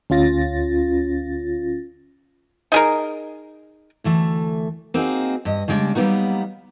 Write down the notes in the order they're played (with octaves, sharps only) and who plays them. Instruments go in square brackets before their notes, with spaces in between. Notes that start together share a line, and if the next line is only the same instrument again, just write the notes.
[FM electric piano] D2 C#4 F4 A6 A#6
[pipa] D#4 G#4 A#4
[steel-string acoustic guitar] D2 E3 A3
A#3 C4 D#4 F#4 G#4
G2 D#5
C#3 G3 G#3 C4 D4
F#3 G3 A#3 B3 D#4 F#4